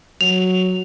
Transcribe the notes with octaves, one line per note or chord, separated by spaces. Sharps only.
F#3 F7